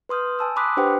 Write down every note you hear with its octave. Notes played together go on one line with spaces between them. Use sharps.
B4 C6 D#6 F6 G6
G#5 A5 E6
B5 C6 D6 D#6 F#6 B6
D4 G4 B4 C5 F#5 G5